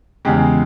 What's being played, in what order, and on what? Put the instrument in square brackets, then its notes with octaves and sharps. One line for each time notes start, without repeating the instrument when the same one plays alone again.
[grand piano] E2 C#3 G#3 G4